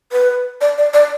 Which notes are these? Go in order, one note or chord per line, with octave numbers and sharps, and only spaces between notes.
B4
D5
D5
D5